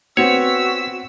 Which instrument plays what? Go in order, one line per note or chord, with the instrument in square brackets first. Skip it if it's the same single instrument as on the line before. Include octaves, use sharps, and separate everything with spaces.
[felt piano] B3 C4 [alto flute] F#4 [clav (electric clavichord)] C#5 [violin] E6 B6